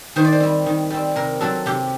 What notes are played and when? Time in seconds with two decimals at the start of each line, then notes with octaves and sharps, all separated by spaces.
0.16 D#3 C5
0.25 D5
0.32 C5
0.40 G3 C4
0.66 D#3
0.91 G3 C4
1.16 C3 A#4
1.41 F#3 C4 A4
1.66 C3 G4